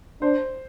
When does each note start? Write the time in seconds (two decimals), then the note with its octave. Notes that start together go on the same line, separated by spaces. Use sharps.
0.22 D4 C5